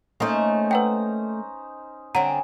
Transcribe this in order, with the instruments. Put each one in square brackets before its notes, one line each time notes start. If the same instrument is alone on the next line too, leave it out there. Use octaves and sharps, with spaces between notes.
[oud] A3 A#3 [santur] C#4 D#4 C5
[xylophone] B4 F#5 G5 [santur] A#5
[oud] D3 C4 [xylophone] C#5 F#5 A#5 [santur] G#5